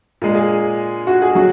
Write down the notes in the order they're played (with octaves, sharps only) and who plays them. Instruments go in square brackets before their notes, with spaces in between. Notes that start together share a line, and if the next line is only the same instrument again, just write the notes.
[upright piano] A#2 G#3
G#4
F#4
G#4
F#3 F#4